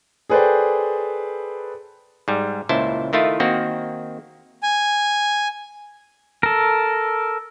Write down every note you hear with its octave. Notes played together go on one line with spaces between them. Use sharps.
G#4 A4 B4 C5 D5 G5
G#2 G3
C#2 A#2 E4 C5 A5
D#3 A3 E4 F4
D#3 A#3 C4 F#4
G#5
A4 A#4